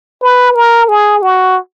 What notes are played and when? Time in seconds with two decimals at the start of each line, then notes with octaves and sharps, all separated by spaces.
0.22 B4
0.55 A#4
0.89 G#4
1.22 F#4